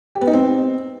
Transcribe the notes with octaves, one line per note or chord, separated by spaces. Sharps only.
G4
B3
D#4
C4